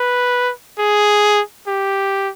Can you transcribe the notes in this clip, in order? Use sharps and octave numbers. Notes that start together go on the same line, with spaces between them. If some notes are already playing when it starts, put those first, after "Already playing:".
Already playing: B4
G#4
G4